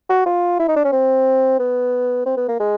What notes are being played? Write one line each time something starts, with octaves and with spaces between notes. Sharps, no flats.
F#4
F4
E4
D#4
D4
C#4
C4
B3
C4
B3
A#3
G#3